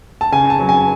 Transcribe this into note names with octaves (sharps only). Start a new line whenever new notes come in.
A5
C#3 G#5
A5
F#3
G#5